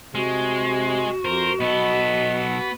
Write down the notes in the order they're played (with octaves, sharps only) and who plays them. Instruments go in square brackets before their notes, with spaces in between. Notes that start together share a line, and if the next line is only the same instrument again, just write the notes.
[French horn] C3 [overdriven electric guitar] G#3 [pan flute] F#4
[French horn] F2 [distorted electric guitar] A#4 [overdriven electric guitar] C5
[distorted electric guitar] B1 A4 [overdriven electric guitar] B3 [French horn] D#5